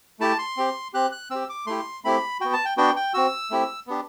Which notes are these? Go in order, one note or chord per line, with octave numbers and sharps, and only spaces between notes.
A3 E4 G4 A5
C6
C4 G4
C4 G4 F#6
F#6
C4 G4 E6
D6
A3 E4 G4 C6
A3 C4 E4 G4 B5
B3 F#4 G5
A5
G5
B3 D4 F#4 G5
G5
C4 F#4 E6
A3 C4 E4 G4
B3 D4 G4